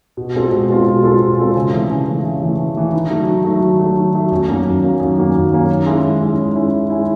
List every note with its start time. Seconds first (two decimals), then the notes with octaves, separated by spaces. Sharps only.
0.17 B2
0.35 G#3 C4 F4 A4
0.52 B2
0.69 G#3 C4 F4 A4
0.86 B2
1.04 G#3 C4 F4 A4
1.21 B2
1.38 G#3 C4 F4 A4
1.56 C#3
1.73 E3 A3
1.90 C#3
2.07 E3 A3
2.24 C#3
2.42 E3 A3
2.59 C#3
2.75 E3 A3
2.93 D#3
3.10 F#3 A3
3.28 D#3
3.45 F#3 A3
3.62 D#3
3.80 F#3 A3
3.97 D#3
4.14 F#3 A3
4.31 F#2
4.48 D#3 F#3 A#3 C#4
4.65 F#2
4.83 D#3 F#3 A#3 C#4
5.00 F#2
5.17 D#3 F#3 A#3 C#4
5.35 F#2
5.51 D#3 F#3 A#3 C#4
5.69 D#3
5.86 G#3 C#4 E4
6.03 D#3
6.21 G#3 C#4 E4
6.38 D#3
6.55 G#3 C#4 E4
6.72 D#3
6.90 G#3 C#4 E4